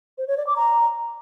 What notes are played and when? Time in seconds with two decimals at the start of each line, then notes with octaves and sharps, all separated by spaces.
0.18 C5
0.28 C#5
0.37 D5
0.47 D6
0.56 A#5